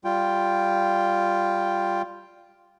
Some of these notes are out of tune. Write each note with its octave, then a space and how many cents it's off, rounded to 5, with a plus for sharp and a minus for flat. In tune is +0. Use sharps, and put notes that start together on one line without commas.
G3 +0 F4 +0 G5 +0